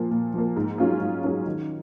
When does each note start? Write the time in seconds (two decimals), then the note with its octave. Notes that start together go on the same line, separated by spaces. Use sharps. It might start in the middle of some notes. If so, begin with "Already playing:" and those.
Already playing: A#2 F3 A#3
0.11 A#2
0.34 F3 A#3
0.56 G#2
0.78 F#3 C#4 F4 G#4
1.00 G#2
1.24 F#3 C#4 F4 G#4
1.46 D#3